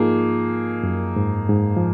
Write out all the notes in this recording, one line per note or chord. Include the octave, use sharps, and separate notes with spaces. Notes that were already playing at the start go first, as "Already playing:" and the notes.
Already playing: G#2 F3 A#3 D#4 G#4
F#2
G#2
G#2
F3